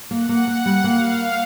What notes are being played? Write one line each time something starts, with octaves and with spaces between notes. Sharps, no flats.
A#3 F#5
A#3
A#3
G3
A#3 F5